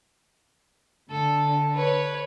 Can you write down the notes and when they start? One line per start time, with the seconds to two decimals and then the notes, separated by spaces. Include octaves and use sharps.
1.10 D3 A4
1.74 B4 C#5